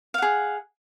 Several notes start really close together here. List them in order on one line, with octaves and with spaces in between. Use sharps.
F5 F#5 G#4